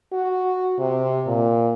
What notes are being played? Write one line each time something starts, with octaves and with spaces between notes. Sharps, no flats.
F#4
C3
A#2